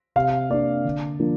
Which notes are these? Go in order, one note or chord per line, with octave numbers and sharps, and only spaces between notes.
C3 F5
A#3 D4 D5
D3
F3 A#3 D4